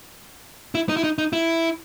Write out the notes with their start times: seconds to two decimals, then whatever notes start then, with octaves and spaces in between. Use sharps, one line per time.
0.75 E4
0.89 D#4
0.97 E4
1.04 D#4
1.18 D#4
1.33 E4